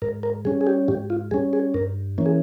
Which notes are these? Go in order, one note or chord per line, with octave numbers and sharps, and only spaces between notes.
G#2 A#4
A#4
G3 C#4 G#4
G#4
G4
G#2 G4
F4
G3 C#4 G#4
G#4
G2 A#4
E3 A#3 C#4
G#4